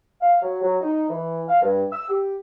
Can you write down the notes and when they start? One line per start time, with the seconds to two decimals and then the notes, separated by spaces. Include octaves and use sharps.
0.21 F5
0.41 F#3
0.61 F#3
0.81 D#4
1.09 E3
1.49 F5
1.61 G2
1.91 E6
2.09 G4